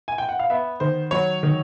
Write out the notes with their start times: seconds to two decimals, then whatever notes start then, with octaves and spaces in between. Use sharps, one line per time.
0.08 G#5
0.18 G5
0.29 F#5
0.39 F5
0.50 B3 E5
0.80 D#3 C5
1.11 F#3 C#5
1.43 D#3